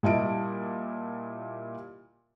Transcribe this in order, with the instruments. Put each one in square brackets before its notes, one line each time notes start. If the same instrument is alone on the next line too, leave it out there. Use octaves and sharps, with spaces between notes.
[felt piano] A#2 G3 E4 D#5 A5 D7